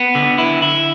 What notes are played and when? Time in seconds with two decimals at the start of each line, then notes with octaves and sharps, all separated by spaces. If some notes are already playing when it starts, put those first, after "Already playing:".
Already playing: B3
0.15 D3
0.38 E4
0.62 E4